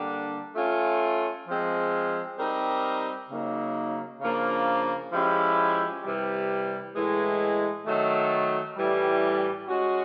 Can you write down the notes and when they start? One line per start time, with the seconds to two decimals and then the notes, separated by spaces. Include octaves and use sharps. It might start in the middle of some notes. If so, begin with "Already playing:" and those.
Already playing: D3 G3 A#3 D4
0.55 A3 C#4 F4
1.46 F3 G#3 C4
2.38 G3 C4 D#4 G4 A#4
3.29 C#3 F#3 A#3 D#4
4.21 C#3 F3 A#3 D4
5.12 F3 G#3 C#4 E4 G4
6.04 C3 E3 G3
6.95 A2 E3 G#3
7.86 D#3 F#3 A3
8.77 A2 E3 G3
9.68 G#3 C#4 F#4